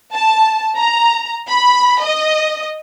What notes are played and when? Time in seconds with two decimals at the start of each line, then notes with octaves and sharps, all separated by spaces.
0.14 A5
0.77 A#5
1.50 B5
2.03 D#5